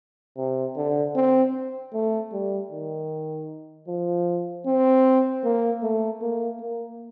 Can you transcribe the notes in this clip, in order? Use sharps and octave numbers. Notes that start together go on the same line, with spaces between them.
C3
D3
C4
A3
G3
D#3
F3
C4
A#3
A3
A#3
A#3